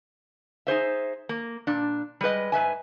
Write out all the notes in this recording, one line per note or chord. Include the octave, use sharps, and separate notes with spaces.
D#4 G#4 C5 E5
A#3
A#2 D4
G3 G#3 B4 D#5
G#2 B4 E5 G#5